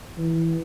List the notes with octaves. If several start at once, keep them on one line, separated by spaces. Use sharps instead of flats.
E3